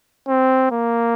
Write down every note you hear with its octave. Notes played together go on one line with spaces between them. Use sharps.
C4
A#3